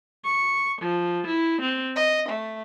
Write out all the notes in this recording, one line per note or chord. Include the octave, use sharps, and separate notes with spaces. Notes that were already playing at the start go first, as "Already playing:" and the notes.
C#6
F3
E4
C4
D#5
A3